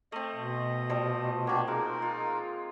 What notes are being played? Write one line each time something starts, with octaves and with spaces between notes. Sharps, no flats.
A3 C4 D#5
B2
F3 G3 A3
A#3 C4 D4 F#4 G4
G#3 D#4 A#4
F4